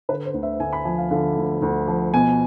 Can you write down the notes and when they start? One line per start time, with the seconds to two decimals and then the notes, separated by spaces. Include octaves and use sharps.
0.09 D3 B4
0.25 C5
0.34 D2
0.43 E5
0.60 D2 G#5
0.73 B5
0.85 F3 G#5
0.98 F5
1.11 D3 F5
1.37 D2
1.62 D2
1.88 F3
2.14 B2 G#5